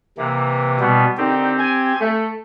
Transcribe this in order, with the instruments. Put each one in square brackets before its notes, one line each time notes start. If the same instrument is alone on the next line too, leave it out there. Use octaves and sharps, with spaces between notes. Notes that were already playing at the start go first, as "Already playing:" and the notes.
[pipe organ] C3 [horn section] E3 A#3
[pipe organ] B2 G3 B3
[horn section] D3 D#3 D#4 [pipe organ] C4 G4
[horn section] G#5
A3